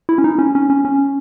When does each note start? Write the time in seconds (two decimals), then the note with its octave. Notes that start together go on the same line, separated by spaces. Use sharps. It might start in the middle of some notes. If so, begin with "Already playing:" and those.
0.09 E4
0.18 C#4
0.24 D#4
0.39 C#4
0.55 C#4
0.70 C#4
0.85 C#4